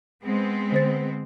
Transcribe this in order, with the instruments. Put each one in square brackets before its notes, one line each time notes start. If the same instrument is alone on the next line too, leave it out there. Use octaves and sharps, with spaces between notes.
[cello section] G#3 B3 C4
[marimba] D3 C5 A6